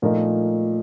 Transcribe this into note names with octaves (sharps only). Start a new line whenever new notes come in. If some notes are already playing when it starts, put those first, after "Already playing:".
A#2 F3 A3 D#4 A#4